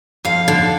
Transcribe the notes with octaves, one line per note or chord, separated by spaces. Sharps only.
F2 F5
D3